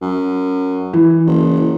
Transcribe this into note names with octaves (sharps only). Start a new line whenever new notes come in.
F#2
E3
F#1